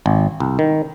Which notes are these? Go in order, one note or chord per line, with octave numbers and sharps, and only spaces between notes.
G#1
C2
D#3